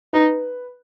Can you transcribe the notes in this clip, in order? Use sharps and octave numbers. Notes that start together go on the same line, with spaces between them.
D#4 B4